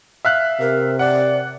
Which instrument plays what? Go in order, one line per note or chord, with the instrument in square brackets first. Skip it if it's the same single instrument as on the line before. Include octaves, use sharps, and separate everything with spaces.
[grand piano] E5 F5 F#6
[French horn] C3 [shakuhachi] A#4
[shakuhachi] D5 [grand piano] F#5